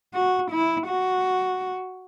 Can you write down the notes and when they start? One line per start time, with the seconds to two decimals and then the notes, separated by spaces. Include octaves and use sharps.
0.14 F#4
0.51 E4
0.88 F#4